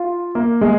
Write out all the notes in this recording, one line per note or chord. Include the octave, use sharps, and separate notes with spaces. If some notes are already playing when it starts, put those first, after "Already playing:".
Already playing: F4
A#3
G#3